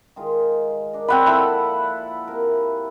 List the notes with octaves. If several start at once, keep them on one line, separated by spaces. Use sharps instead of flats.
D#3 G#3 F4
D4 A#4
F3 C4 F#5 G5 B5
A#2 E4 A4 B5 C#6
C3 A#4